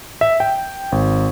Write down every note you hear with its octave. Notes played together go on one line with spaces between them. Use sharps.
E5
G5
G#1